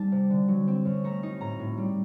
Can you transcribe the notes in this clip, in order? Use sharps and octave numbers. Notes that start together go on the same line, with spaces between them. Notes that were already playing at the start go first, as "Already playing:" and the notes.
Already playing: G3 C4 D#4 A5
C3
D3
F#3
C4
F#2
A3 A#5
D#4
A2 A#5
A2
G3